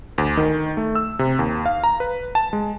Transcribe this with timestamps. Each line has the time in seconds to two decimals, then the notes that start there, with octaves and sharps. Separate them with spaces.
0.18 D2
0.37 D#3
0.77 A3
0.95 E6
1.19 C3
1.39 D#2
1.66 F5
1.84 A#5
2.00 B4
2.35 A5
2.53 G#3